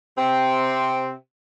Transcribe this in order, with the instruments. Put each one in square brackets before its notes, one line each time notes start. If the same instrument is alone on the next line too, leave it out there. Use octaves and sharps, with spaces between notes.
[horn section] C3 C4